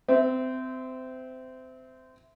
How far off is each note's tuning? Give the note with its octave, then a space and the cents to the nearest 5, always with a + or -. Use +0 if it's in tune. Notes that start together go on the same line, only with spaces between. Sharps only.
C4 -25 E5 +0